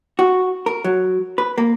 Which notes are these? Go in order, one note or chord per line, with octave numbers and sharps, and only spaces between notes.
F#4
A#4
F#3
B4
A#3